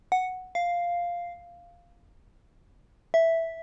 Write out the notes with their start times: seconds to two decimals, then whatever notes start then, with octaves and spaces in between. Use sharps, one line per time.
0.12 F#5
0.55 F5
3.14 E5